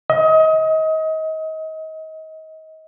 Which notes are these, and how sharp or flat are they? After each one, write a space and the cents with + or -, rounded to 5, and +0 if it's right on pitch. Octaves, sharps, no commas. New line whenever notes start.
D#5 +30